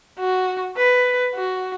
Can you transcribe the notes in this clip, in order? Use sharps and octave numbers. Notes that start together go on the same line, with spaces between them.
F#4
B4
F#4